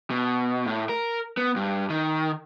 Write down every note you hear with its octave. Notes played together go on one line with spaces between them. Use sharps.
B2
A2
A#4
B3
G2
D#3